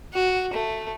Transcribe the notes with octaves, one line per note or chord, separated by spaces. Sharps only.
F#4
A3